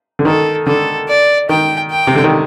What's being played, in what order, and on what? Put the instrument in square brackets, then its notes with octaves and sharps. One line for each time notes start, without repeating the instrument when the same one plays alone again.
[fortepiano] D3
[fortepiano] D#3 [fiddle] A4
[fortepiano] D3 [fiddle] A4
[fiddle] D5
[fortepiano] D#3 [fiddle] G5
[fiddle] G5
[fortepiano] C3
D3
D#3